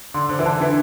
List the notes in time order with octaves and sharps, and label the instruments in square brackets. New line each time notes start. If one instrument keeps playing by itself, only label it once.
[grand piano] D3 [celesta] C6
[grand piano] D3 [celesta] C5
[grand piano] E3
[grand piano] D3 [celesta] A5
[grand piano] E3 [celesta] D4